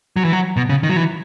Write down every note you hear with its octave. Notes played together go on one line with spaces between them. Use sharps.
F#3
E3
F#3
B2
C#3
D#3
F#3
E3